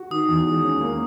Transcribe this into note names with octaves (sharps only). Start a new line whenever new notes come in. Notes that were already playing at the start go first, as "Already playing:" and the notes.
Already playing: F#4
D#3 D#6
E2
G#3
C#4
A#3